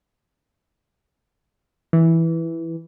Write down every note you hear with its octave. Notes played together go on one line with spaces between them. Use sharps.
E3